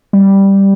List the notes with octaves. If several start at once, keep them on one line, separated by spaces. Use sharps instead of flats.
G3